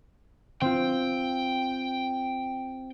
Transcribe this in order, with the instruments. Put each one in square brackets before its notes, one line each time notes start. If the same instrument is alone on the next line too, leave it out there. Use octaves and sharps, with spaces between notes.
[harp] C4 F4 [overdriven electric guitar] G5